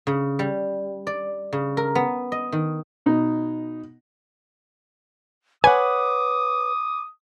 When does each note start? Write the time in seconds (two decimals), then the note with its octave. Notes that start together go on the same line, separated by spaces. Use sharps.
0.07 C#3
0.39 G3
1.07 D5
1.53 C#3
1.77 A#4
1.95 B3
2.32 D#5
2.52 D#3
3.06 B2 D#4
5.64 B4 C#5 F#5 G#5 D6 D#6